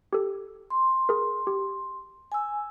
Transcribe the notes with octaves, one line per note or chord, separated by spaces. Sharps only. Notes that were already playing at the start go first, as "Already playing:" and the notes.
G4 A4
C6
G#4 A#4
G4
G#5 E6